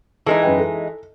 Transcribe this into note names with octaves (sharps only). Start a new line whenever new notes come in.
E3 G#3 D#4 A4
F#2 B4 G5
A4